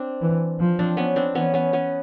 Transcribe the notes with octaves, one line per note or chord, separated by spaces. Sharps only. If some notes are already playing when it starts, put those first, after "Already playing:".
Already playing: C4 D4
E3
F3
C4 D4
B3 C#4
C4 D4
E3 B3 C#4
B3 C#4
B3 C#4